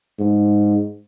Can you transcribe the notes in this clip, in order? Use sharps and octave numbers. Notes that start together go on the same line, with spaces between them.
G#2